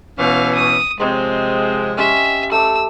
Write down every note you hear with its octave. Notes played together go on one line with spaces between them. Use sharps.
B2 E3 C#4 F5
D#6
C3 F3 G#3 C4 C#5 D#5 C6
C#4 G4 E5 C6
A3 D6 E6